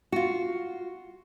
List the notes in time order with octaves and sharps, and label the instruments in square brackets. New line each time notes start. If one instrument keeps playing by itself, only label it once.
[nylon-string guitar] F4 F#4